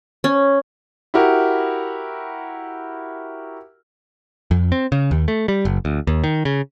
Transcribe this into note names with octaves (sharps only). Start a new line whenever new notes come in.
C#4
E4 F#4 G4 A#4
F2
C4
C#3
D#2
A3
G3
F#1
D2
D#2
D#3
C#3